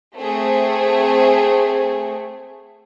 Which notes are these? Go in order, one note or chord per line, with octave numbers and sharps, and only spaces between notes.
A3 C4 G#4